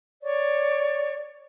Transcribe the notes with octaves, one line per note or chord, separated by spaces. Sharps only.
C#5 D5 C#6